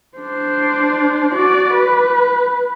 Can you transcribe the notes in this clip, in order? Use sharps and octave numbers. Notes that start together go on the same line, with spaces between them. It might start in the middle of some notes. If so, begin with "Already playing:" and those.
D4 C5
F#4 D5
B4